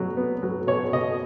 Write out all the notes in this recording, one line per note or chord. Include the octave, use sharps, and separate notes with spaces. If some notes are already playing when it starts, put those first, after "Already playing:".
Already playing: B2 F#3
B3
F#3
B2 C#5
B2 D#5